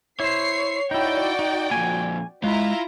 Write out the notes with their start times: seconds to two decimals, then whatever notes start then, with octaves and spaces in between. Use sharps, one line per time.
0.20 E4 C5 C#5 C7
0.91 D#4 E4 F#4 D5 G5
1.39 D#4
1.71 F2 A#2 G#5
2.44 G#3 E4 F4 A#5